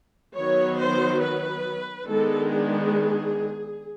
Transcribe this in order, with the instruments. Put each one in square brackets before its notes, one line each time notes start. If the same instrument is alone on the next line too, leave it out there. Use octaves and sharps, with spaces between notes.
[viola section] D#3 F#3 B3 C#5
C5
B4
D#3 G#3 B3 D4 A4
G#4